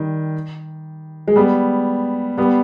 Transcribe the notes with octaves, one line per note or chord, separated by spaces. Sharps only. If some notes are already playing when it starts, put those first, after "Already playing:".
Already playing: D#3 G3
G#3
G3 B3
G3 B3